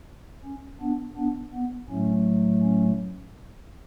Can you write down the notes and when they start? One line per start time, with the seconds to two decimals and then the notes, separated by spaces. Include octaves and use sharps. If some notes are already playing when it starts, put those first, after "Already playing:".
0.44 C#4
0.81 B3 D4
1.17 B3 D4
1.54 B3
1.90 A2 F#3 A3 C#4
2.62 C#4